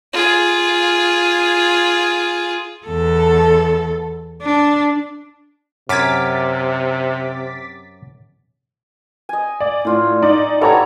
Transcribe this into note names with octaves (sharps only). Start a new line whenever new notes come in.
F4 G#4
E2 A4
D4
F#2 C3 D6 F6 G#6 A6 B6
D#5 G#5
D5
A2 D4 F4 C#5
D#4 D5
B3 E4 G4 A4 C#5 A#5